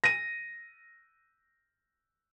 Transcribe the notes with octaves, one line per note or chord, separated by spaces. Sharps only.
A#6 D#7